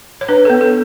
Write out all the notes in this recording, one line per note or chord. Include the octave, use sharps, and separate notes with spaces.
C#5
D4 B4
B3 A4
A4